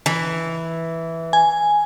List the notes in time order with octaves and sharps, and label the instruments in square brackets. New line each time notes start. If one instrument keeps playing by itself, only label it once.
[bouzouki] E3
[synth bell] G#5